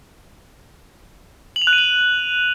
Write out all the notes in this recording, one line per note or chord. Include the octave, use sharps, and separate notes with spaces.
F#7
F7
F#6
D#7
F#7